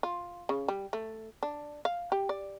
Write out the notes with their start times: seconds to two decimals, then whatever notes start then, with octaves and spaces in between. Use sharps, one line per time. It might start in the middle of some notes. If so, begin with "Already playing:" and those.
0.03 F4
0.49 C#3
0.68 G3
0.93 A3
1.43 D4
1.85 F5
2.12 G4
2.29 D5